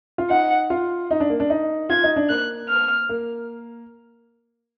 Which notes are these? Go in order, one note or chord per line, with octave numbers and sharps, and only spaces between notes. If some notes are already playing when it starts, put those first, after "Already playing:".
F4
D#4 F#5
F4
D#4
D4
A#3
D4
D#4
F4 G#6
D#4
D4
A#3 F#6
F6
A#3